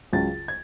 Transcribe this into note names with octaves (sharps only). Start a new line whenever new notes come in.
C#2 C#3 F#3 A6
G#6